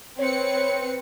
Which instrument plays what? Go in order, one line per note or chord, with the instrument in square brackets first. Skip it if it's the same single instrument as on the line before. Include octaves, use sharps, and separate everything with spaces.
[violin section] C4 B4 C#7 [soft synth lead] C#5